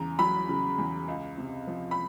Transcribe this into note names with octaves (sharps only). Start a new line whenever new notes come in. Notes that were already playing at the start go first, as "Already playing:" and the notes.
Already playing: E2 C#3 A#5
F#3 B5
C#3
E2
C#2
C3
F3
B5